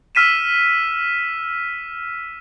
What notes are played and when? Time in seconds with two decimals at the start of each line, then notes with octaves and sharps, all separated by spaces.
0.15 E6 F6 B6 D#7 E7